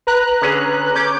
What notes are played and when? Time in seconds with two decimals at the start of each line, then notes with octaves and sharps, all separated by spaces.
0.07 B4 A#5 F#6
0.42 D3 C#4 G#4
0.95 C#4 D6 G6